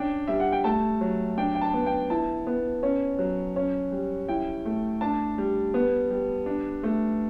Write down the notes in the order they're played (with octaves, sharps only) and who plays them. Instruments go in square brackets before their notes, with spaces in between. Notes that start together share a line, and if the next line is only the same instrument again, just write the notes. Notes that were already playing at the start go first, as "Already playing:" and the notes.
Already playing: [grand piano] C#4 D4 G5
G3 E5
F#5
G5
A3 A5
F#3
D4 G5
G5
A5
B3
G5
E4 A5
B3
C#4
F#3
C#4
G3
E4 G5
A3
D4 A5
G3
B3
G3
D4
A3